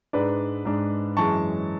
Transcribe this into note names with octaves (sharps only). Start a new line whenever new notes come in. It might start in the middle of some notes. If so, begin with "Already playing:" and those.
G#2 G#3 D4 B4 D5
G#2 G#3 D4
F#2 E3 G#3 A5 C#6